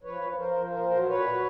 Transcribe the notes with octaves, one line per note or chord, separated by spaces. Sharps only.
F3 B4 C#5
F3
F3 A#4 C5
F3
A#2 A#4 C5
F#3
A#2 B4 C#5
F#3